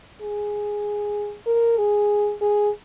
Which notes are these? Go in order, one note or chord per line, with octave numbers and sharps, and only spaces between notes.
G#4
A#4
G#4
G#4